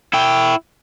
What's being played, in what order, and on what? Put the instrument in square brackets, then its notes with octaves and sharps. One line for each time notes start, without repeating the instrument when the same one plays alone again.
[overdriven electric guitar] E4 G5